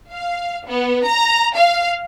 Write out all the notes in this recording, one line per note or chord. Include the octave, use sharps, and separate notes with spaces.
F5
B3
A#5
F5